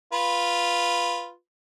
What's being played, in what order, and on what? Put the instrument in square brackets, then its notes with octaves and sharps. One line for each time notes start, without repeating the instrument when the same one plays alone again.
[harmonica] F4 B4